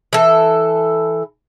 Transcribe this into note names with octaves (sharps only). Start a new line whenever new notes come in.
E3 A4